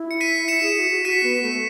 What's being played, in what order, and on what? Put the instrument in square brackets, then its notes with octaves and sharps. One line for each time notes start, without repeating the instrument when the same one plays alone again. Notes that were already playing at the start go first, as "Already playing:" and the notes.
Already playing: [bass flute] E4
[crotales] C#7
B6 D#7
[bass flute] E4 [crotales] C#7 E7
[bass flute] G#4
F#4
F#4
[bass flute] F#4 [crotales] B6 D#7
[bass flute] B3
A3